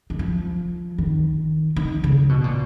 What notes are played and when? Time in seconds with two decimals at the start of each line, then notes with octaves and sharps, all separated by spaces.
0.10 D#3
0.19 F3
0.98 D#3
1.76 D#3
2.04 C#3
2.29 B2
2.44 A#2